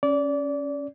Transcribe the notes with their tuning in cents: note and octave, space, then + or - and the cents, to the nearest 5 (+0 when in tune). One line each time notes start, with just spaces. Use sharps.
C#4 +0 D5 -25